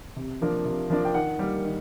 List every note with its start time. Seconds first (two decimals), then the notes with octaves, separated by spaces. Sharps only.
0.16 C3
0.41 F3 A#3 D4
0.65 C3
0.90 F3 A#3 D4
1.05 G5
1.15 D#3 F#5
1.39 G3 A#3
1.64 D#3